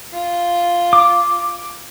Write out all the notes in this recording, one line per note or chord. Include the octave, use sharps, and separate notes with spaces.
F4
D6